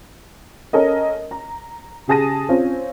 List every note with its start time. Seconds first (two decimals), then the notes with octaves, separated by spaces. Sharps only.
0.73 C#4 A4 A#4 C#5 D#5
1.31 A#5
2.08 C#3 G4 G#4 A5 A#6 D#7
2.49 C4 C#4 F4